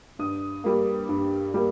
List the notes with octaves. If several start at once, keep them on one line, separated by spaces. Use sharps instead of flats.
G2 D#6
G3 A#3
G2
G3 A#3